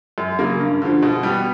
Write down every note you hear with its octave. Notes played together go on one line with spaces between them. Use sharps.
F#2
C#3 F#3 A#3
G2
D3 F3
B2
G3 B3